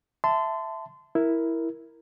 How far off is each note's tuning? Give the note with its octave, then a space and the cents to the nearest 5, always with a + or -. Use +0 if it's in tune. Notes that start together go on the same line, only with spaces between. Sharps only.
E5 +5 A5 +5 C6 -25
E4 +0 A#4 +0